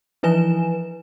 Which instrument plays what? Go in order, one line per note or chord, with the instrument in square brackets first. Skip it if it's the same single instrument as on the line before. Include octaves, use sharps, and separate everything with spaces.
[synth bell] E3 F3 E4 B4 G#5 E7